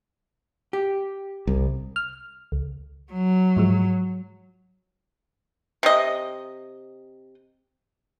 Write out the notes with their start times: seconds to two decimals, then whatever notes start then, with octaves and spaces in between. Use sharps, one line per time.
0.73 G4
1.47 C2
1.96 F6
2.52 C#2
3.13 F#3
3.56 G#2 F3 G#3
5.83 C3 D#5